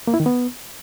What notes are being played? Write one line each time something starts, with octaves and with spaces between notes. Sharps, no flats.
A#3
E4
D#3
B3